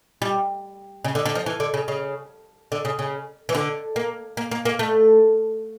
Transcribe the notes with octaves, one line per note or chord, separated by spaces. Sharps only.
G3
C#3
D3
D3
F3
E3
D3
C#3
C#3
D3
C#3
C#3
E3
D3
A#3
A#3
A#3
A#3
A3